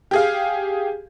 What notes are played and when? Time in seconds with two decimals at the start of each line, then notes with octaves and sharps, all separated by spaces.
0.11 G4 G#4 F5